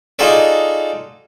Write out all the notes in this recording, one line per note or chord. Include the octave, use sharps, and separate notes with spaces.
D#4 F4 F#4 G#4 A4 D5